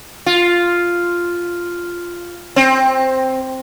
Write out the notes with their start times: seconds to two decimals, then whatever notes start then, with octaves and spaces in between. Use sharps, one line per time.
0.26 F4
2.56 C4